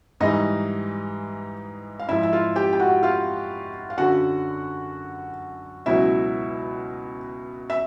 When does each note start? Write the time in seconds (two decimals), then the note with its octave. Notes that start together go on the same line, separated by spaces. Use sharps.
0.20 G#2 E3 G3 D#4 D#5
1.99 F5
2.08 G#2 F3 E4 E5
2.23 E5
2.33 F4 F5
2.56 G4 G5
2.73 G5
2.79 F#4 F#5
3.03 F4 F5
3.90 F5
3.98 F#2 D3 F#3 F#4 F#5
5.86 C#2 B2 F#3 E4 E5
7.70 E5